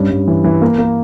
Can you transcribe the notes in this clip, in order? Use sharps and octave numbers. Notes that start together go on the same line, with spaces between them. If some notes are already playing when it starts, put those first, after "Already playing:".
Already playing: G2 C#4
G2
E3
E3
A#3
A#3